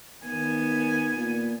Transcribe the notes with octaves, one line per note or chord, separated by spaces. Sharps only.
D#3 B3 G#5
A#2